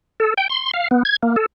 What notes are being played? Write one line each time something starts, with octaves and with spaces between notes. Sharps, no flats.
A4
G5
C6
F5
B3
G#6
A#3
A4